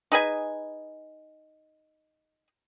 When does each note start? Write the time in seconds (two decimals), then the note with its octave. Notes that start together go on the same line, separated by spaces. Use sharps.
0.12 D#4 G#4 B4 G#5